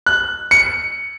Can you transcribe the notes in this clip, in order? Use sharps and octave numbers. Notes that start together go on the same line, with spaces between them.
F#6
C#7